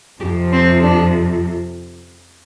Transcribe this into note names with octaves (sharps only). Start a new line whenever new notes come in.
F2 C3 F3 G4
C4
D4